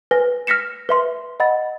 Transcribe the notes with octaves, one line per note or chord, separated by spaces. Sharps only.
B4 G#5 A#6
F6 A#6 B6 C#7 E7
B4 E5 C6
D#5 F#5 B5 A6